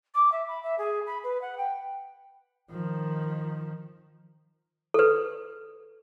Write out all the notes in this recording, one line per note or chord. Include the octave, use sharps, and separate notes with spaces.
D6
E5
B5
E5
G#4
B5
B4
F#5
G5
D#3 F3
A4 B4